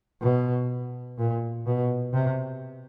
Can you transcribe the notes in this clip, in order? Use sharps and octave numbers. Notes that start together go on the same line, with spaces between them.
B2
A#2
B2
C3